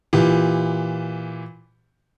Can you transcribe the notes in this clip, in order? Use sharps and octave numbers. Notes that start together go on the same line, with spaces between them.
A#2 E3 G4